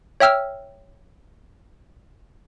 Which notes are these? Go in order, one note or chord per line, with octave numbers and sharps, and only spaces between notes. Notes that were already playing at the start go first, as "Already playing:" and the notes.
C#5 E5 G5 E6 F6